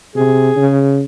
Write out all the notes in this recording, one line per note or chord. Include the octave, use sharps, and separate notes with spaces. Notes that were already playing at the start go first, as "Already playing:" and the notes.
C3 G#4
C#3